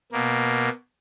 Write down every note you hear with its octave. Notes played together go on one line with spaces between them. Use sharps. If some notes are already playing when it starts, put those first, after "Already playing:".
B2 A#3